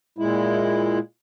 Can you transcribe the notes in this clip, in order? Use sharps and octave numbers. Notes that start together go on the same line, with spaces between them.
A#2 G#3 E4